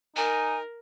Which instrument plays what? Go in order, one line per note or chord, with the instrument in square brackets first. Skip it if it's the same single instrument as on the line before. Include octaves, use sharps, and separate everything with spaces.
[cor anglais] D#4 [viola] A#4 [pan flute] G#5